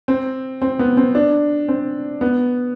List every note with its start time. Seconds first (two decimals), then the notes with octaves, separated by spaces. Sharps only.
0.08 C4
0.62 C4
0.79 B3
0.97 C4
1.15 D4
1.68 C4
2.21 B3